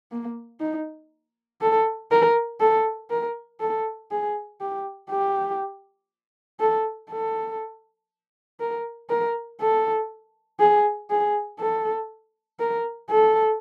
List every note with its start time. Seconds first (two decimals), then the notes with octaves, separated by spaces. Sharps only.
0.12 A#3
0.60 D#4
1.61 A4
2.11 A#4
2.60 A4
3.10 A#4
3.60 A4
4.11 G#4
4.61 G4
5.10 G4
6.60 A4
7.10 A4
8.60 A#4
9.10 A#4
9.61 A4
10.60 G#4
11.10 G#4
11.59 A4
12.60 A#4
13.10 A4